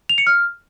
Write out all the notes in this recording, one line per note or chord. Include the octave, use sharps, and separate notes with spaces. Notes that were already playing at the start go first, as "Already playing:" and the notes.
F7
C#7
F6